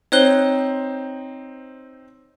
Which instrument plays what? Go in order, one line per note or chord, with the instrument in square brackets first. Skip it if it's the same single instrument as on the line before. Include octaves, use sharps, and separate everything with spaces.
[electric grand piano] C4 D#4 C5 [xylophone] C#5 F#6 G7